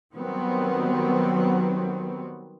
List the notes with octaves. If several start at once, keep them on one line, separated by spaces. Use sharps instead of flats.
D#3 F#3 G3 B3 C4